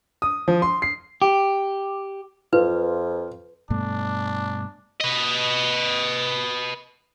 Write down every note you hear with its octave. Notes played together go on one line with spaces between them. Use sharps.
D#6
F3
C6
C7
G4
F2 F4 B4
G2 B2 A3 D4
B4 D#5